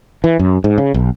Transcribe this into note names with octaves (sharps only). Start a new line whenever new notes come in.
E3
F#2
G#2
C#3
B1